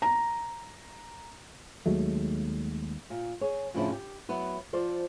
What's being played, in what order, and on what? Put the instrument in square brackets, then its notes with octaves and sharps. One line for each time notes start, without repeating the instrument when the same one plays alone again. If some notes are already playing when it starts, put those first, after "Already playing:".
[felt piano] A#5
[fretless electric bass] D#2 F#3 G#3 A3
[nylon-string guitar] A#2
G#4 C#5
F2 A2 C#3 F3 D4 E4
G4
F#3 B3 E4
F3 C5 D5